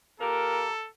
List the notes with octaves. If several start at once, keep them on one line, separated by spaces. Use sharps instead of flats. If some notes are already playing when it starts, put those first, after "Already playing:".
A#2 G4 A4 A#4 A#5